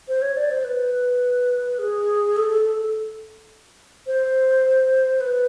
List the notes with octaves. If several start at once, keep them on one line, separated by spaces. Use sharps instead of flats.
C5
C#5
D5
C5
B4
G#4
A4
A4
A4
A4
C5
B4